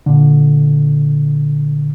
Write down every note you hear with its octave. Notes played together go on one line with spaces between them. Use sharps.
A#2 D3